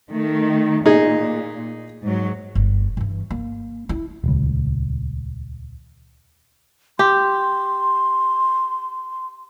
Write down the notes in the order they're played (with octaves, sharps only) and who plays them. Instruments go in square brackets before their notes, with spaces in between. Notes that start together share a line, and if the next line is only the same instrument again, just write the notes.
[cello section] D#3 A3
[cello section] A#2 [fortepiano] D#4 G#4
[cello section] G#2 F#3
[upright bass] G1
G2 E3
A#3
E4
[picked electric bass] D#1 C#2
[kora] G4 [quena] C6